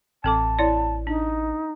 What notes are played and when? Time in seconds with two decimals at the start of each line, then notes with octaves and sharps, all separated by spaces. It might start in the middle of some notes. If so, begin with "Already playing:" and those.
0.24 A1 C4 A4 A5 D6
0.59 E4 C#5 D5
1.07 D4 D#4